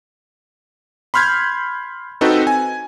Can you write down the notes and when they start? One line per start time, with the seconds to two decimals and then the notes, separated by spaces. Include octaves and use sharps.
1.14 B5 C6 F6 G6 G#6
2.21 C4 D#4 F#4 A4 B4
2.47 G#5